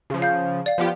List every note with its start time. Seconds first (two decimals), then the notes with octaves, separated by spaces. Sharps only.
0.10 C#3 F3
0.22 F5 G6
0.66 D5 F5
0.78 F3 B3 G4